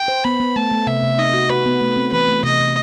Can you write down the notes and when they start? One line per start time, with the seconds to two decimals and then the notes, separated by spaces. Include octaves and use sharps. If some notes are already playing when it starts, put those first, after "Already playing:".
Already playing: G5
0.08 C5
0.24 B3 B5
0.40 B3
0.56 A3 A5
0.72 A3
0.87 C3 E5
1.03 C3
1.18 D#4 D#5
1.33 F#4
1.49 F#4 B4
1.66 B3
1.81 A3
1.96 C4
2.12 E3 B4
2.29 A3
2.43 C3 D#5
2.60 C3